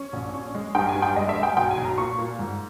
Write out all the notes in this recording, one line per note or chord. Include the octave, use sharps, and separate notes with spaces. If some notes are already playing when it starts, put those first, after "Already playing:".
Already playing: C#4
A#1
C#4
G#3
G2 G5
G#5
G2
G5
G#3 D#5
E5
G#3
G5
B1 G5
G#5
B1
A#5
A#2 C#6
A#2
G#2